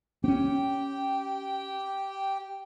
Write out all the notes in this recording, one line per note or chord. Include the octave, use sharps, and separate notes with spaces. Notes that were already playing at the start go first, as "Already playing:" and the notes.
C4 C#4 G4 G5